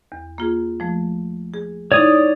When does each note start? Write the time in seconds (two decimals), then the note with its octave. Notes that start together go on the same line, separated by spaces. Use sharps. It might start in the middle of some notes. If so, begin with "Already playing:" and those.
0.12 E2
0.38 A#3 F4 G#4
0.80 F3 A3
1.54 G#4
1.92 D#4 E4 C#5 D5 D#6